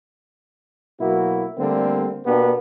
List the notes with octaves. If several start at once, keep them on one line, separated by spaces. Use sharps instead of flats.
B2 F#3 A#3 E4 F#4
D3 G3 A3 A#3 C4
B2 A#3 B3 D4 G4